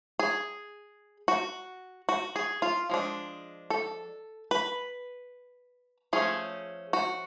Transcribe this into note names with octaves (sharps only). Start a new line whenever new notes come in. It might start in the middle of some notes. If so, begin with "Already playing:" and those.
G#4
F#4
F#4
G#4
F4
F3 G#3 D4
A4
B4
F3 A3 C#4 G#4
F#4